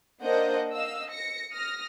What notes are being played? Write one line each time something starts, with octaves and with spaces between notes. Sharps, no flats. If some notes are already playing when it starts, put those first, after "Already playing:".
A#3 D4 C5 D#5 F#5 G6
D#5 F5 E6
A#6 C#7
D#6 F6 A#6